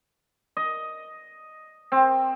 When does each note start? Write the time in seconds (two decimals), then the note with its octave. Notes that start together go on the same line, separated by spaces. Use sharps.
0.57 D#5
1.92 C4